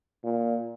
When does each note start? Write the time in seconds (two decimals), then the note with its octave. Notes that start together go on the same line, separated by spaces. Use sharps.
0.24 A#2